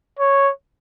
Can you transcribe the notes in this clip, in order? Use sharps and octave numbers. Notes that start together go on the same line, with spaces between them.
C#5